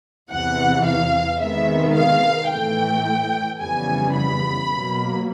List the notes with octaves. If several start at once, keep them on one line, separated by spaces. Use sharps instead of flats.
E2 C3 E3 F#5
F5
C3 D#3 G#3 B3 E5
F5
A2 E3 A3 G5
F2 C#3 E3 G3 B3 G#5
B5
B2 F#3 A#3